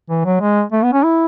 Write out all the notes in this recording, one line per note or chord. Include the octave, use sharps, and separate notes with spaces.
E3
F#3
G#3
A3
B3
C#4
E4